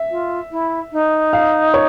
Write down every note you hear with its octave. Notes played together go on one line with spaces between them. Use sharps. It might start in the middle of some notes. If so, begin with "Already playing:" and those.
Already playing: E5
F4
E4
D#4
F5
C#5